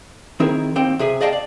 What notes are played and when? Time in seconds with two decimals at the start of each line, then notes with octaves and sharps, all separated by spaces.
0.40 D#3 C4 E4 G#4 A#4
0.76 D#2 C4 G5
0.99 C3 G#4 E5 G#5
1.21 G#4 D5 D#5 F5 G5 A5
1.33 D5